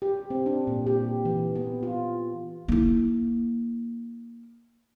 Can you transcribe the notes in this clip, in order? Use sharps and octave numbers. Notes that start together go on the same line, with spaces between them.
G4
C4
D4
A#2
G4
E3
B3
F4
A#3 E4